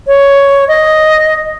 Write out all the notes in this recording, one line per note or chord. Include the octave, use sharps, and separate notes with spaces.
C#5
D#5